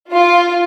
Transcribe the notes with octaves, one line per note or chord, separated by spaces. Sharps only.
F4